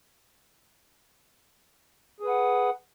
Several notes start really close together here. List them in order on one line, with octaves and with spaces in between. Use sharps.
G#4 B4 F#5